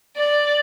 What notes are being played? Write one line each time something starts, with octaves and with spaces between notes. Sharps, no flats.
D5